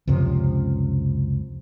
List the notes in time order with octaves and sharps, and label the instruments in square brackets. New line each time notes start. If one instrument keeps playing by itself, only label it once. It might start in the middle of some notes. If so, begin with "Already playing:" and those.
[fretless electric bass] C#2 F#2 C3 F3